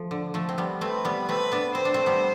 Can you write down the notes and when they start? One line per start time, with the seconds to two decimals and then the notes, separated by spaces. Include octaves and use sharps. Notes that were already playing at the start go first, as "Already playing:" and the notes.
Already playing: F3 A3
0.11 D3
0.34 F3 A3
0.49 C4
0.58 G3 B3
0.81 A3 C4 B4
1.05 G3 B3
1.28 A3 C4 B4
1.52 B3 D4
1.75 C4 C5
1.85 D4
1.94 A3 C4
2.06 G3 B3